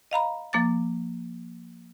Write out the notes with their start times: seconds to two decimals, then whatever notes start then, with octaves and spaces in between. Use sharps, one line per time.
0.11 D#5 F5 A#5 B5
0.53 F3 A#3 D6 A6